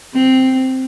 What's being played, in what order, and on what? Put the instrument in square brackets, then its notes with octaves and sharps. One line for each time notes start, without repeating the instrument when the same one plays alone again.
[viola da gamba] C4